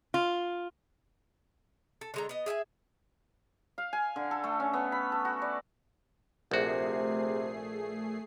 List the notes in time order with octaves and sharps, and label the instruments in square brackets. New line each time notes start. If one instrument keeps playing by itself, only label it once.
[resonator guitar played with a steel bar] F4
[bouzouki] A4
D3 G#3 A#5
B3 D#5
G#4 E5 G5 G#5
[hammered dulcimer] F5
G#5
D3
A4
A3
C#4
B3
B5
A4
F#4
D5
[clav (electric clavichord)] A#1 F#4 [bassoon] C3 [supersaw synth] A3 G#4 C7